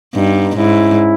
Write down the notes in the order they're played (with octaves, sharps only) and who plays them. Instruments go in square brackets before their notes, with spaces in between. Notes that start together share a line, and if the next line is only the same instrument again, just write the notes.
[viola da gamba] G2 [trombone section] B3 D#4
[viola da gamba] G#2 [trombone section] C#4 E4